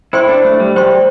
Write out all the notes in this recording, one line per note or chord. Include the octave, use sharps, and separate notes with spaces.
E4 C5 G5 C6
D4
A3
G3
G3 C5 G5 C6